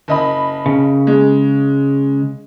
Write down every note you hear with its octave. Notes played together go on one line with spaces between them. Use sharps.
F#1 D#5 B5
C#3
G#3